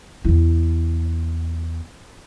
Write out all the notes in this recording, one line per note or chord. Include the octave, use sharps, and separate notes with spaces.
E2 E4